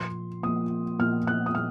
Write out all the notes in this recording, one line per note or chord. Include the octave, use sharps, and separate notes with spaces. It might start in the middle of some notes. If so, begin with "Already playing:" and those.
Already playing: A#2 F3 A#3 C6
A#2 F3 A#3 D#6
A#2 F3 A#3 F6
F#6
D#6
A#2 F6